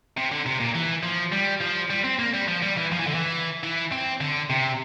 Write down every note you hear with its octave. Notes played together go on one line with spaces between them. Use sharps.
C3
D3
C3
A#2
E3
F3
G3
F3
G3
C4
A#3
G3
F3
G3
E3
F3
E3
D3
E3
E3
C4
D3
C3